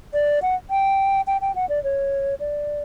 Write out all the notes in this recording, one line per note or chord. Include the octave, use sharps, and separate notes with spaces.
D5
F#5
G5
G5
G5
F#5
D5
C#5
D5